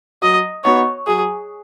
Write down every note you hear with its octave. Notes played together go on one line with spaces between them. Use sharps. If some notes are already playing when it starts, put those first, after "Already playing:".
F#3 D#5
B3 D#4 F#4 C#5
F#3 G#4